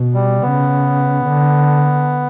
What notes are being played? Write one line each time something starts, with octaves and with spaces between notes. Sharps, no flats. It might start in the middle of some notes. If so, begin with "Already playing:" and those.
Already playing: B2
G3
C#3 B3
D3